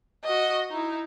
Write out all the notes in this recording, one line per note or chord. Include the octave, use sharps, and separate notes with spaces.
F#4 D#5
D#4 E4